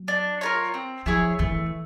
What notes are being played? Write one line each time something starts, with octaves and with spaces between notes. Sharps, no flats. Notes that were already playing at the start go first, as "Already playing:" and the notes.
Already playing: F#3
D4
F4 A#4 C#5
C4
F3 E4 G#4 C#5
E3 A3